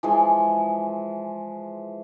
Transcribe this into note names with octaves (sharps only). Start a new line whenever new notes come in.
E3 F3 G#3